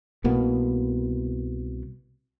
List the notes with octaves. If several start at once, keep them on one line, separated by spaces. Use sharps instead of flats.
C2 B2 A#3 B3